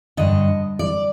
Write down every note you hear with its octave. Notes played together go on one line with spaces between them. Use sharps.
G2 D3 D#5
D5